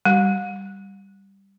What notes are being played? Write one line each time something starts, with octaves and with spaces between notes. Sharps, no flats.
G3